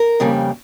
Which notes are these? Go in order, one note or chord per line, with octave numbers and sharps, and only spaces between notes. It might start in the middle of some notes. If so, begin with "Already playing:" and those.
Already playing: A#4
F2 C#3 G3 A#3